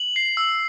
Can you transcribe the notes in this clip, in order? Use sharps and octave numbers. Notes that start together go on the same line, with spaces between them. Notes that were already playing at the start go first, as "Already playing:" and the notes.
Already playing: F#7
C7
E6